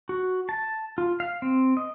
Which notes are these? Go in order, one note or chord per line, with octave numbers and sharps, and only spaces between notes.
F#4
A5
F4
F5
C4
D#5